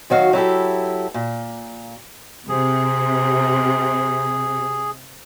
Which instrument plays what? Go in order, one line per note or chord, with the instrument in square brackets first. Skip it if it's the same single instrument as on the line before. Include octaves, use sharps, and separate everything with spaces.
[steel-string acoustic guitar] D#3 F#3 F#4 F5
F#3 E4 G4 A4
A#2
[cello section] C3 [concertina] G#4